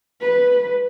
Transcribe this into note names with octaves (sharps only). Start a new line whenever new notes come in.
B4